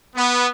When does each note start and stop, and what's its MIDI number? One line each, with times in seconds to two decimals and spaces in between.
0.15 0.48 59